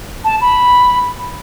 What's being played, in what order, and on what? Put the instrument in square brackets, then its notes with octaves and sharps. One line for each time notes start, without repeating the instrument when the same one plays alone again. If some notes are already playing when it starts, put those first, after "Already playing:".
[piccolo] A5
B5